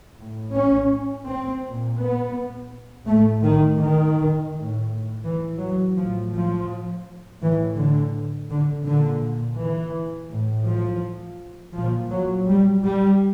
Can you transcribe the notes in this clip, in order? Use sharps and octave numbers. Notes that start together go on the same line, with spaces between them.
A2
C#4
C4
A#2
B3
A2 A3
D#3
D#3
A2
E3
F#3
A2 F3
F3
A2 E3
D3
D3
A#2 D3
E3
A2
F3
A#2 F3
F#3
G3
G3